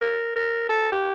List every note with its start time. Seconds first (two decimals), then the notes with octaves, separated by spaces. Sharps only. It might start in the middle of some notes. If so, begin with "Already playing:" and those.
0.01 A#4
0.36 A#4
0.69 A4
0.92 G4